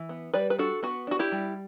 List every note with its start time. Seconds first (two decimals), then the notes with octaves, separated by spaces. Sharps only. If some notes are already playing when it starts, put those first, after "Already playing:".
Already playing: E3
0.09 B3
0.34 G3 B4 D5
0.50 B4
0.59 D4 F#4 A4
0.83 B3 F#4
1.07 D4 F#4
1.19 E4 G4
1.32 G3